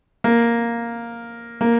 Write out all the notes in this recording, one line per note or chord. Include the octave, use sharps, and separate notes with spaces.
A#3
A#3